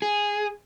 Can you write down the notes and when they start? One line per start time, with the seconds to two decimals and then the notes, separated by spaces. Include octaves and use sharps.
0.02 G#4